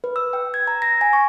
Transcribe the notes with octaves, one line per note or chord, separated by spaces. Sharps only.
B4
E6
G5
G#6
A#5
A#6
G#5
C#6